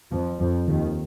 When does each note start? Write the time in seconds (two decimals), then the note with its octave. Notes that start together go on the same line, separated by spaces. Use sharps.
0.11 F2 F3
0.39 F2 F3
0.68 D#2 D#3